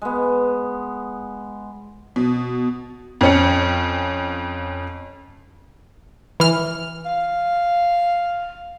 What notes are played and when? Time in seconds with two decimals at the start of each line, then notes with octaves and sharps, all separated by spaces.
0.02 G#3 B3
2.16 B2
3.21 F2 C#4 C#7
6.40 E3 F6
7.06 F5